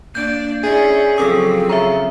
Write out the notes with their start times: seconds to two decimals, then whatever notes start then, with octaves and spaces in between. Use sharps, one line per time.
0.15 A#3 D4 D5 G6
0.64 C#4 E4 G#4 D5
1.18 C#3 F3 F#3 C4 G#4 A4 D#6
1.70 C#3 E5 A#5